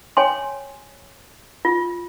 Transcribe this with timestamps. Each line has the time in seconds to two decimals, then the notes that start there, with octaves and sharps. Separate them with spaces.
0.17 C#5 G5 G#5 C6
1.65 F4